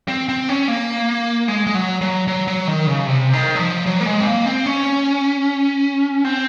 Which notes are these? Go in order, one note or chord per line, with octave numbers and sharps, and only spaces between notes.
C4
C4
C#4
A#3
G#3
G#3
F#3
F#3
F#3
F#3
D#3
C#3
C3
D#3
F#3
F3
F#3
A#3
G#3
C4
A#3
C4
C#4
C4